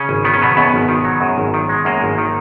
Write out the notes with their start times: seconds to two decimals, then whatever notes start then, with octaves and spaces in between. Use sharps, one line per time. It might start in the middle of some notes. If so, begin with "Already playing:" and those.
Already playing: C#3 C#4
0.09 G#1
0.25 D#3 B3
0.34 C#4
0.42 B2 F#3 B3
0.57 F#2 B2 B3
0.74 G#1
0.89 D#3
1.05 F#3
1.21 F#2
1.38 G#1
1.54 D#3
1.69 G#3
1.85 F#2 A#3
2.02 G#1
2.18 D#3